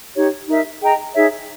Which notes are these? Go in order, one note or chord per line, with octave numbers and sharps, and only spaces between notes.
D#4 G4 C#5
D#4 A#4 E5
G#4 D#5 G5 A#5
D#4 G#4 C#5 E5